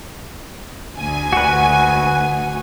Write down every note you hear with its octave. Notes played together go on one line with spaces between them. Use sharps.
D2 G#5
F#4 B4